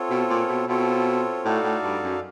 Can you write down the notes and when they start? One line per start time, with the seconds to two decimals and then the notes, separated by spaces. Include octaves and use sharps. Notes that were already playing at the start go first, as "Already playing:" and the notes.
Already playing: C4 F4 A4 C#5
0.10 B2
0.30 A#2
0.49 B2
0.68 B2 C4 F4 A4 C#5
1.45 A2 D#4 F#4 A4 D5 F5
1.64 A2
1.83 G2
2.03 F#2